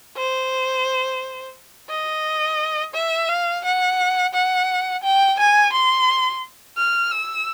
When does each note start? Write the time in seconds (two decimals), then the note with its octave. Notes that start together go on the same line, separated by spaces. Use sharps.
0.17 C5
1.90 D#5
2.94 E5
3.29 F5
3.64 F#5
4.34 F#5
5.03 G5
5.39 G#5
5.73 C6
6.78 F6
7.12 E6